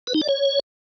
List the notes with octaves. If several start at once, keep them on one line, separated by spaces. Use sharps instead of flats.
B4
D#4
D5
C#5